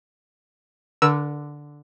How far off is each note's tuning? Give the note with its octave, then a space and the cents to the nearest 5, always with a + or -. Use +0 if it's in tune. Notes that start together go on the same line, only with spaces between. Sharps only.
D3 +0 A#4 +40 E6 +0